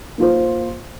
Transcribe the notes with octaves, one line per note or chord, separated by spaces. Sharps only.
A#3 F4 C5